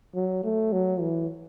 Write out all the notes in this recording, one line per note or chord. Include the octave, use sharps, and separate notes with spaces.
F#3
A3
F#3
E3